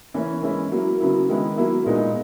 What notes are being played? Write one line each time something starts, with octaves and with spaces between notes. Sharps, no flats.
E3 A#3 C#4 E4
E3 G#3 C#4 E4
F#3 A#3 E4
C#3 F#3 B3 E4
D#3 G#3 B3 E4
F#3 A#3 E4
A#2 G#3 B3 D#4